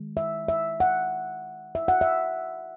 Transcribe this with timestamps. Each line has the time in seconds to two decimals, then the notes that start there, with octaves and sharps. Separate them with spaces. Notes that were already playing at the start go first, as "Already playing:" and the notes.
Already playing: D#3 G#3
0.17 E5
0.48 E5
0.80 F#5
1.75 E5
1.88 F#5
2.01 E5